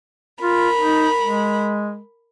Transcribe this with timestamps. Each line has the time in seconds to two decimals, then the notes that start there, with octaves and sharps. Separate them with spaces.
0.42 F4 A#4 B5
0.78 D#4
1.22 G#3